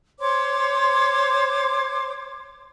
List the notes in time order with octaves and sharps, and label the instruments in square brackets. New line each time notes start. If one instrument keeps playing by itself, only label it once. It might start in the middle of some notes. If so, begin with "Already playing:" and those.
[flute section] C5 C#5 C6 D6